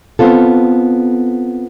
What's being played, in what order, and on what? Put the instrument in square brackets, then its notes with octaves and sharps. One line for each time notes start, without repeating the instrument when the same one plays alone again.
[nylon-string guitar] B3 C4 F4 A4